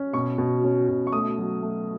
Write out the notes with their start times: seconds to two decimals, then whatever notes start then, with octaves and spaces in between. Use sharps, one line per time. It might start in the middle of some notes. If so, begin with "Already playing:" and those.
Already playing: C#4
0.13 B2 C#6
0.38 B2
0.64 C#4
0.89 B2
1.07 C#6
1.12 A3 D#6
1.38 F#3
1.62 A3